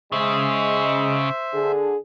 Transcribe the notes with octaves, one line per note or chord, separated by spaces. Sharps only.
C#3 G#3 C5 E5
D3 G#4